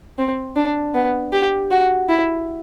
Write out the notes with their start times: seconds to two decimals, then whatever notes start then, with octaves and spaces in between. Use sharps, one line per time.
0.18 C4
0.56 D4
0.94 B3
1.33 G4
1.71 F#4
2.09 E4